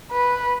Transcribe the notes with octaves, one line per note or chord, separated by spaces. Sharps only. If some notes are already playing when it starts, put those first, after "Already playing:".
B4